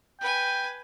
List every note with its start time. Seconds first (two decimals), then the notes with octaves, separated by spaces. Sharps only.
0.21 B4 G5 G#5